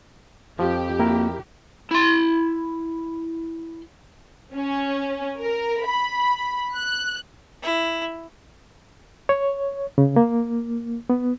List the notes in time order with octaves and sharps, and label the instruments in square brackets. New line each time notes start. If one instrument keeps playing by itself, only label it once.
[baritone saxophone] F2 [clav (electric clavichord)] F3 [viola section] G4
[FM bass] A#3 [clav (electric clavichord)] E4 A#4
[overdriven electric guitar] E4 C6
[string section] C#4
A#4
B5
F#6
[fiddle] E4
[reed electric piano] C#5
C#3
A#3
B3